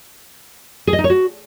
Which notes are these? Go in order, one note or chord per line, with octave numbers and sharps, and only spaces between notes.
G#4
D#5
D#4
C#5
F#4